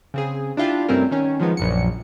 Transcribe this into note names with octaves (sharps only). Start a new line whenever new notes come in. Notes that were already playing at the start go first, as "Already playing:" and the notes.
C#3 C4 G#4
D4 E4 F4 G4
G2 C3 A3 C4 C#4 A#4
D#3 C#4
D#3 F3 G#3 B3
A#1 F#2 C#7